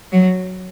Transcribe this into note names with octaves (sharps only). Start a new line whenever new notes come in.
F#3